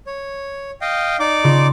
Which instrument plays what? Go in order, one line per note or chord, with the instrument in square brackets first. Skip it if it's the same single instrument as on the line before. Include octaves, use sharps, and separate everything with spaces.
[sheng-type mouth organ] C#5
D#5 F5 G5
D#4 D5 D6
[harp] C#3 F4